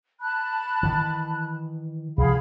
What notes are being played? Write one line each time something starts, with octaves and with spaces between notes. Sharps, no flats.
A5 B5 F#6
D#3 E3
C2 F3 G#4 F5 B5